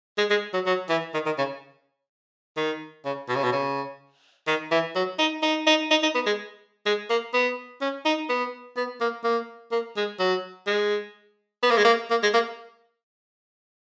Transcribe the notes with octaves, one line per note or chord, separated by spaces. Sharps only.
G#3
G#3
F#3
F#3
E3
D#3
D#3
C#3
D#3
C#3
B2
C#3
B2
C#3
D#3
E3
F#3
D#4
D#4
D#4
D#4
D#4
B3
G#3
G#3
A#3
B3
C#4
D#4
B3
B3
A#3
A#3
A#3
G#3
F#3
G#3
B3
A#3
G#3
A#3
A#3
G#3
A#3